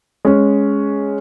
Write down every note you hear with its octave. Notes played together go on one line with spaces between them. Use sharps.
G#3 C#4